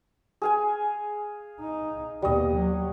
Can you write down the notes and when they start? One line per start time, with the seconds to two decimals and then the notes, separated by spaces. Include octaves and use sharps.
0.42 G#4 F5 G#5
1.61 D#4
2.22 D#2 B2 G3 D#5
2.55 F#3